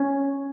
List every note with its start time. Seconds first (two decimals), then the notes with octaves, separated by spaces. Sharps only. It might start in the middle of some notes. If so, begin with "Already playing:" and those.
Already playing: C#4